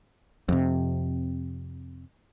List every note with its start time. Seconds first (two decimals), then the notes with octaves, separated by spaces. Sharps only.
0.49 F2 C3